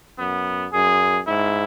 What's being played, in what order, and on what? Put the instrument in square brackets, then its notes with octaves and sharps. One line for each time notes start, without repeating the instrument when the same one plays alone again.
[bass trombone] F#2 [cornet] B3
[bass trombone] F#2 [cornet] G#4
[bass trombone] G#2 [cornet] E4